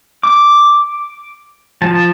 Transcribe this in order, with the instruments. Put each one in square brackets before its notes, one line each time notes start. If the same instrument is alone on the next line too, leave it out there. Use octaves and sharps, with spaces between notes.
[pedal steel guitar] D6
F3 A5